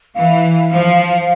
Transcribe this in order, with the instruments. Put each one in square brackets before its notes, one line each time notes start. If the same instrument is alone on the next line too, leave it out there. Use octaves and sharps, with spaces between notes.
[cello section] E3 [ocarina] F5
[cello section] F3